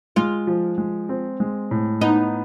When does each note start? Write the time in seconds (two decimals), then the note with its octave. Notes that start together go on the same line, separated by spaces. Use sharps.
0.16 G#3 F4
0.47 F3
0.78 G#3
1.09 C4
1.40 G#3
1.71 A2
2.01 B3 D#4